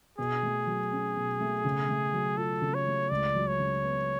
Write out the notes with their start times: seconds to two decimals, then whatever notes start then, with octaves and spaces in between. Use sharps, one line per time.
0.18 B2 G#4
0.43 A3
0.67 F#3
0.92 C#4
1.16 B2
1.41 A3
1.64 C#3
1.89 A3
2.13 F#3
2.37 F4 A4
2.62 C#3
2.75 C#5
2.86 A3
3.10 C#2 D5
3.35 F#3
3.47 C#5
3.59 C#3
3.84 B3